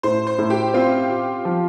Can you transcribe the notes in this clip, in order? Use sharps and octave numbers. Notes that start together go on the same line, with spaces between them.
A2 C5
C5
A2
G4
C4 F4
G4
F3